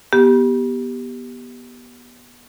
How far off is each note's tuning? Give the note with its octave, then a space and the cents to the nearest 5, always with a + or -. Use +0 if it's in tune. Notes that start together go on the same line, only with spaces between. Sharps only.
B3 -20 G4 +0